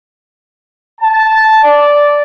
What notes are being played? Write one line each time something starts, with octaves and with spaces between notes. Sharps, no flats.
A5
D5